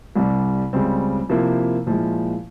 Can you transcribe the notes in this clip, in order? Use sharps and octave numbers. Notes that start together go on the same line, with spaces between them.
C2 C3 G3
C#2 C#3 G3 C4
C3 F3 A#3 E4
A#2 F3 G#3 E4